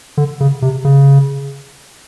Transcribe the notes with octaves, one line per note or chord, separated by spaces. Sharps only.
D3
C#3
C3
C#3